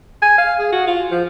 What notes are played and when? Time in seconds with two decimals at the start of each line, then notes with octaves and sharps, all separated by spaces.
0.22 G#5
0.38 F5
0.59 G#4
0.72 F#4
0.87 F4
1.11 F3